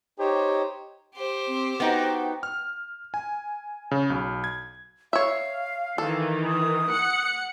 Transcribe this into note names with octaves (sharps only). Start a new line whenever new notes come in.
D#4 G4 C5 C#5
G4 C5
C4
B3 D#4 F#4 G5
F6
G#5
C#3
B1
G#6
C#5 E5 F5
D#3 E3 A4
D#6
F#5 C#7